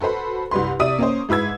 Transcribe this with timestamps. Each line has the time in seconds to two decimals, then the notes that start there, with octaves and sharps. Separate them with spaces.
0.01 F#4 A4 B4 C5 B5
0.51 C2 G2 B4 C6
0.79 C3 D5 E5 D#6 D#7
0.99 A#3 C#4 C5
1.29 G#2 E4 B4 E6 G#6